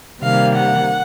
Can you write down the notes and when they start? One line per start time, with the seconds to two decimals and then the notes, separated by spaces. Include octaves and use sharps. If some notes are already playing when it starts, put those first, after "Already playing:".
0.21 C3 D#3 G3 A#3 F5
0.55 F#5